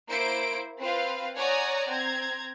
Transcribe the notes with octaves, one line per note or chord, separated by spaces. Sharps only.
A#3 E4 C5 D7
C4 F4 B4 F5
C#5 D5 F#5 G#5 A#5 D#6
C4 A#5 G#6